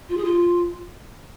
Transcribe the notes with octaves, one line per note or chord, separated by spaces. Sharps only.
F4
G#4
F4